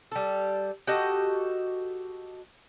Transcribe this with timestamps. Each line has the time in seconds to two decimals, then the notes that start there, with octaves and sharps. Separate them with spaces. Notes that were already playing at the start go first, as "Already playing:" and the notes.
0.12 G3 A4
0.87 F#4 G4 A4 D#5